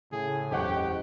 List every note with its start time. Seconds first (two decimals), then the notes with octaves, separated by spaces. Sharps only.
0.12 A2 C#3 G#4
0.51 F#1 E2 G4 D#5 F#5 C#6